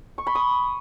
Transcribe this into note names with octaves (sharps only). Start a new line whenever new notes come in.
C#6
B5
D#6